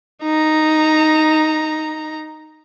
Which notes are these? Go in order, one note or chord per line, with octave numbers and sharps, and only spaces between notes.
D#4 A#5